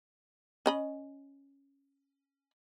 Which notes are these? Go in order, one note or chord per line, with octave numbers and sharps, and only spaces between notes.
C#4 D#5 B5